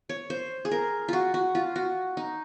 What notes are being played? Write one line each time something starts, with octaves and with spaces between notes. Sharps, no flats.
C#5
C5
G#4
A#4
F4 F#4
F#4
F4
F#4
D#4